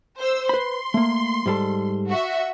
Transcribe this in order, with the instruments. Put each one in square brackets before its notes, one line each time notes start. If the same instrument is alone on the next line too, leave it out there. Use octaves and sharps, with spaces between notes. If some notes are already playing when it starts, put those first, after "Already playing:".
[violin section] C5 E6
[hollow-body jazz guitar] B4 B5 [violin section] C6
[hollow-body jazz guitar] A3 A#3
G#2 G3 A4
[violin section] F#4 E5